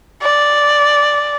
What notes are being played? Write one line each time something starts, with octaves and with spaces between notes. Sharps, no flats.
D5